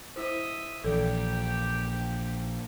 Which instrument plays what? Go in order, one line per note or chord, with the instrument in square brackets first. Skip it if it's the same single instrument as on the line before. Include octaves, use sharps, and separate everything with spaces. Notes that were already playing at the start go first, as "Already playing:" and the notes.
[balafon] E4 C5 [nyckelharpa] D#5 E5
[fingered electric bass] A#1 [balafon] E3 A4 [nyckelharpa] G4 G5